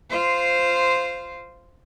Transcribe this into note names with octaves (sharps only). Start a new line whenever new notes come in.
F4 C5